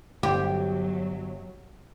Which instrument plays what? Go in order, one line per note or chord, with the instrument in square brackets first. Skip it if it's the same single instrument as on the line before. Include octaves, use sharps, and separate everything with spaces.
[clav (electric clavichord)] G1 C5 [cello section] F#3 [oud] G4